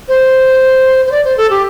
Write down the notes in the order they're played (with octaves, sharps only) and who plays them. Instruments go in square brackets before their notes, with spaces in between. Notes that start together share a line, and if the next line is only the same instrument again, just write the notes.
[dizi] C5
C5
D5
C5
A4
G4